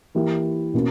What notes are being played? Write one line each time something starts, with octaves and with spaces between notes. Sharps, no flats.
E3 A#3 E4 G4
B2 A#3 C#4